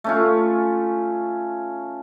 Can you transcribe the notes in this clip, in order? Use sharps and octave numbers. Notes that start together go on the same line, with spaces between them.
A3 C#4 F4